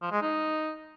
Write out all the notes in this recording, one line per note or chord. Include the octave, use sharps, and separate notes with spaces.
F3
G#3
D#4